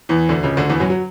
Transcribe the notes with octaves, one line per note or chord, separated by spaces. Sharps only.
E2 E3
D2 D3
C#2 C#3
D2 D3
E2 E3
F#2 F#3
F#3